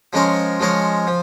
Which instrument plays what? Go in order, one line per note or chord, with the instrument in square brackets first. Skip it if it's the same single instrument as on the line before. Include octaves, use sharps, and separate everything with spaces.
[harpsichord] F3 G#3 C#4 A#4
F3 G#3 C#4 A#4
F3